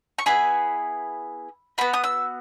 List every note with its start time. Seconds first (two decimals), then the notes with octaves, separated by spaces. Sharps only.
0.18 C#6
0.26 B3 E4 G#4 B5
1.78 B3 F#4 B5
1.93 D#6
2.04 E6